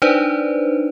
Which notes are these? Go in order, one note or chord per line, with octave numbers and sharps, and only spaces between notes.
D4 D#4 B4 C5 D5